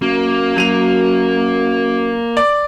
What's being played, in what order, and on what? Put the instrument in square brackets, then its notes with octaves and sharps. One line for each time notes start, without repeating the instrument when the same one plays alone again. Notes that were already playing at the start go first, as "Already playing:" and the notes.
[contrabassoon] F#2 [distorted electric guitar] A#3
[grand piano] F#3 D#7 F7
D5